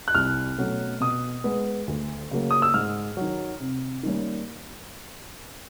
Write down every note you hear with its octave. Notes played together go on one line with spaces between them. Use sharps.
F#6
C2 F6
B2 F#3 A3 C#4
B2 D#6
G#3 B3
D2
C#3 F#3 A#3
D#6
E6
G#2 F6
D#3 F#3
C3
D#3 G3 A#3 C#4